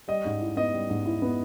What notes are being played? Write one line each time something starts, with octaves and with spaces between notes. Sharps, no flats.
G3 D#5
G#2
E4
B3 D#5
G3
G#2
E4
B3